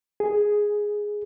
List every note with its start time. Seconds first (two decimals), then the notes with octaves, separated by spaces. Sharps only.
0.20 G#4